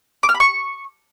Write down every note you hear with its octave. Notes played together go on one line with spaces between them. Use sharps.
D6
F6
B5
C#6